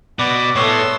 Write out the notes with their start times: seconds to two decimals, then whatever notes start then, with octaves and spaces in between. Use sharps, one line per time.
0.19 B2 F#4 B4 D5
0.55 A2 A3 B3 C#5 C6 E6